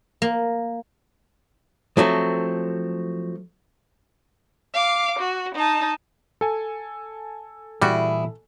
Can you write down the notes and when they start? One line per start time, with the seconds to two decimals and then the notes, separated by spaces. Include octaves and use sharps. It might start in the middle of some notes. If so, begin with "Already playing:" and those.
0.22 A#3
1.97 F3 F#3 A3 C4
4.74 F5 D6
5.19 F#4
5.55 D#4 A5
6.41 A4 G#5
7.82 A#2 E3 G3 E4 F#4 G#4 D5